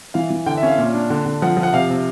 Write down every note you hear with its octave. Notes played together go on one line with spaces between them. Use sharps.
E3 F5
E3
D3 G5
E5
C#4 F5
A#2
D4
D3
D3
F3 F#5
F3
F#5
C3 F5
C3